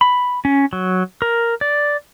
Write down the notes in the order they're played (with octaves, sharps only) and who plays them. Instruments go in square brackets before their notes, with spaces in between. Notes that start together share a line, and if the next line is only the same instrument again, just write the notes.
[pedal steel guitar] B5
C#4
F#3
A#4
D5